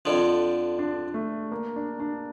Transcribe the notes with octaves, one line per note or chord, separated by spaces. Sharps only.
F2 D3 F3 D4
D4
A3
A#3
D4
D4